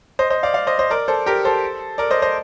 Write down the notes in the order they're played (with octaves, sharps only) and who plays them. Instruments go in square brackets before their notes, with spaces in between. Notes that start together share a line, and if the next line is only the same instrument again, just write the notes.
[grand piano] C5 D#5
C5 D#5
D5 F5
D5 F5
C5 D#5
C5 D#5
A#4 D5
A4 C5
G4 A#4
A4 C5
A#4 D5
C5 D#5
C5 D#5